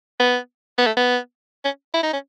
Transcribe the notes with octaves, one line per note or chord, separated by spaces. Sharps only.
B3
B3
A3
B3
C#4
E4
D#4
C#4